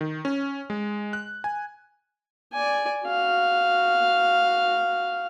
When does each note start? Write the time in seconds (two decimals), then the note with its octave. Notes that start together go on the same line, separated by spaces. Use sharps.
0.01 D#3
0.25 C#4
0.70 G#3
1.13 F#6
1.44 G#5
2.53 D5 G#5
3.06 F#4 F5